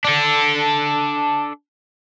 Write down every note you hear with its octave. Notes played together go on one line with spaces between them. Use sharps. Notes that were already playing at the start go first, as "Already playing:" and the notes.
D4 A4